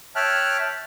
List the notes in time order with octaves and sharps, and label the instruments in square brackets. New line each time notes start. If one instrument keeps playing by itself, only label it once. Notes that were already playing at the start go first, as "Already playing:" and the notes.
[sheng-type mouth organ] C#5 E5 G5 A5 F6 F#6